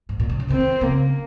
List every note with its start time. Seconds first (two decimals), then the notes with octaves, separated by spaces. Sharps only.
0.09 G#2
0.19 A#2
0.29 C3
0.40 C#3
0.50 D#3 C4
0.81 C#3 A#3